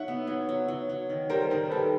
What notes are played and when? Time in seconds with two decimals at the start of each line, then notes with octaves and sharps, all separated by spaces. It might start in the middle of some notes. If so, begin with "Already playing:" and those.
Already playing: F#3 D#4 E5 F#5
0.08 B3
0.27 F#3
0.49 F#3
0.68 F#3
0.89 F#3
1.10 D#3
1.30 G3 A#4 C5
1.50 D#3 A#4 C5
1.70 G3 A4 B4